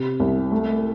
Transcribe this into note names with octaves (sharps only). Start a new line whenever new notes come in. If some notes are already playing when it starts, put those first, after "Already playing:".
Already playing: C3
C2
A3